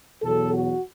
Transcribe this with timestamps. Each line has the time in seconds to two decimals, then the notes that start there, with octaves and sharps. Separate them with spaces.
0.22 E2 B2 F#3 A4
0.54 F#4